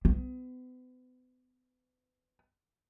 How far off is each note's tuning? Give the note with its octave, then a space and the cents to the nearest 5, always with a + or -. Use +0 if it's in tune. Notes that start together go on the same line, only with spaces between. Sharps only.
B3 +40